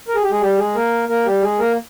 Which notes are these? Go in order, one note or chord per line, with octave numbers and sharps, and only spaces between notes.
A#4
G#4
G4
G#3 G#4
G3 G4
G#3 G#4
A#3 A#4
A#3 A#4
G3 G4
G#3 G#4
A#3 A#4